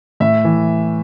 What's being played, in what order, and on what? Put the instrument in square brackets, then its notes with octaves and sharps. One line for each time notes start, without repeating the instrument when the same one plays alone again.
[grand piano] A2 E5
E3